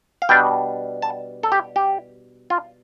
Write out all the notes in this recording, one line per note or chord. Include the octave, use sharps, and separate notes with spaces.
F5
B2 G3 D4 G5
A5
A4
G4
G4
F4